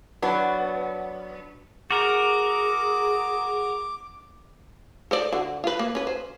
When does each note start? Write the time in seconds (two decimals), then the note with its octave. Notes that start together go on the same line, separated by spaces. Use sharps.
0.22 F#3 B3 D4
1.91 F#4 G#4 A#4 D6
5.11 A4 C5 D5
5.33 D3 F#4
5.64 F4 B4
5.79 A#3
5.95 C#4 B4
6.07 C5